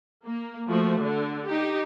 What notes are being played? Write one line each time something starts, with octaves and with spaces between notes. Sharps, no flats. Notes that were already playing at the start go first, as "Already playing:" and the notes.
A#3
F3 A3 F#4
D3
D#4 G4